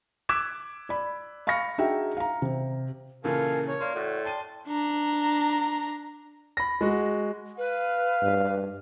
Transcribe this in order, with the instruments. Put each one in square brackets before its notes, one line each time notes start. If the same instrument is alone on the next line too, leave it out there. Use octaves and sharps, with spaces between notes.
[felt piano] D6 E6 F#6 G#6 B6 E7
D5 B5
F5 B5 C#6 F6 A#6 C#7
D4 D#4 F#4 G#4 E5 G5
F5 A#5
C3
[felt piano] A#2 C#3 E3 [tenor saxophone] F4 [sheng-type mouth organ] A4 G#5 [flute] A#4
[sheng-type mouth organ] C#5
[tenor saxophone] A#3 [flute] D5 [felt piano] C6
[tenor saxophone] A2 [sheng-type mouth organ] F#4
[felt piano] G5 D#7 [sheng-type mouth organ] A5 C6
[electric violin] D4 A#5
[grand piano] B5 A#6
G#3 F#4
[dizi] B4 [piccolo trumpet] F5
[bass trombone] G2